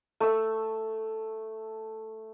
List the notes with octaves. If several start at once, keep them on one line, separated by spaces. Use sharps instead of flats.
A3 E6